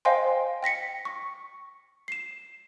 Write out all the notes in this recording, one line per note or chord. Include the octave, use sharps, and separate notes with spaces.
C5 D#5 F5 G5 G#5 C6
G5 A#6 B6 C#7
C#6
C7 E7